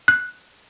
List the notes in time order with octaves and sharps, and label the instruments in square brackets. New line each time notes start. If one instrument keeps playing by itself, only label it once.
[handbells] F#6